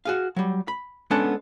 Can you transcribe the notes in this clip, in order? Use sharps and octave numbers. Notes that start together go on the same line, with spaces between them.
F#4 G#4 F5
F#3 G3
B5
G#3 B3 C#4 D4 A4 F#5